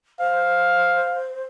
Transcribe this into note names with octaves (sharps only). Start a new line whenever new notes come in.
C5 F5